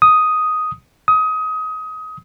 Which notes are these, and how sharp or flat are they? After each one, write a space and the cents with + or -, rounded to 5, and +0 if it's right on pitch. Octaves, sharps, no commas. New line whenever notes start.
D#6 +5
D#6 +25